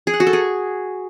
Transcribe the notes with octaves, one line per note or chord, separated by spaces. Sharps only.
G#4
F#5
F#4
A4
G#4